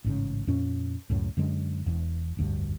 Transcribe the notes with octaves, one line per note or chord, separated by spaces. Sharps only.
A1 G#2 C#3
F2 A#2 C#4
C#2 F#2 A2
F#2 D3 G#3
E1 E2
F1 D2 G2